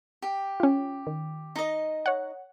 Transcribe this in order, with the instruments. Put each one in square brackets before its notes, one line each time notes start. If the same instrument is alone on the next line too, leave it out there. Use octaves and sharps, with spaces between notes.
[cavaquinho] G4
[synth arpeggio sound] C#4 F4
D#3
[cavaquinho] D#4 D#5
[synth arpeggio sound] C#5 F#5